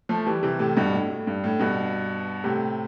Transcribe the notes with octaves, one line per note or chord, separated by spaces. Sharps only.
F3 A3
E3 G3
C3 E3
A2 C3
G2 B2
A2
A2
G2
A2
G2 B2
A2 C3